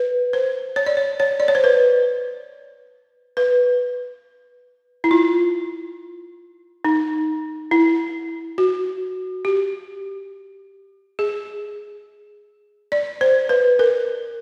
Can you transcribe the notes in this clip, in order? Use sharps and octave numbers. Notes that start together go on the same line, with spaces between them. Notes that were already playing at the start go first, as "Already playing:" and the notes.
Already playing: B4
C5
C#5
D5
C#5
C#5
D5
C#5
C5
B4
B4
E4
F4
D#4
E4
F#4
G4
G#4
D5
C5
B4
A#4